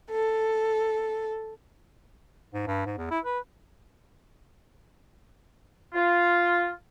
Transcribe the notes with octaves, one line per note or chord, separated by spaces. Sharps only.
A4
G#2
G2
G#2
E2
E4
B4
F4